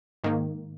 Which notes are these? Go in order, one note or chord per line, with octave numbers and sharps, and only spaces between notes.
G#2 D#3 A#3